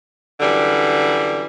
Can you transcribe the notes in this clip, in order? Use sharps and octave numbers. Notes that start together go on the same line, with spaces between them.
F#2 D3 E3 G3